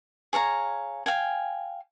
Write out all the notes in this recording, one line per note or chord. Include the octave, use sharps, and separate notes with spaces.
G#4 C#5 F5 A#5
F5 G5 G#5